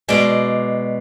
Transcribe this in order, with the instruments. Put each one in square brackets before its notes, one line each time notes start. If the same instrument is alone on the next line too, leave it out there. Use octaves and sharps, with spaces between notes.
[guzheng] B2 G#3 D5